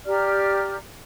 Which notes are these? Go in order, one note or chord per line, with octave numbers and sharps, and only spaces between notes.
G4 D5 A#5 F6